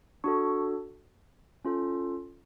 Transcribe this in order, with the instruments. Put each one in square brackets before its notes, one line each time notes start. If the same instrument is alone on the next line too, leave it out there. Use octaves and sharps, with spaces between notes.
[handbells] D4 F#4 A4 C#6
C#4 F4 A4